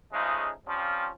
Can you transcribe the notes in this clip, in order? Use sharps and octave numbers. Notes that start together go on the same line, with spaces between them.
C#3 F3 G#3 A3 D#4
F3 G3 C4 C#4 F4